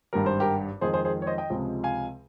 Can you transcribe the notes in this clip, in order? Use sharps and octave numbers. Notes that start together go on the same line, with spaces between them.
G#1 G2 G3 A#4
C5
G4 A#4
F2 D#3 G#3 G#4 C5
G#4 C5
G#4 C5
C#5
C5 D#5
D#5 G5
C#2 C3 F3 G#3
F5 G#5